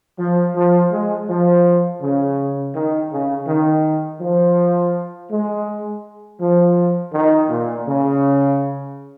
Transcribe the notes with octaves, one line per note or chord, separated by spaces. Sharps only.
F3
F3
G#3
F3
C#3
D#3
C#3
D#3
F3
G#3
F3
D#3
A#2
C#3